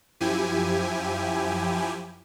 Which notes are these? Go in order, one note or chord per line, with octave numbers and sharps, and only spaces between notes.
F#2 F3 E4 G4 G#5